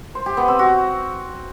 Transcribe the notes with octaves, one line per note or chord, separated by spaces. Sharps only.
C5
G4
B3
C4
F#4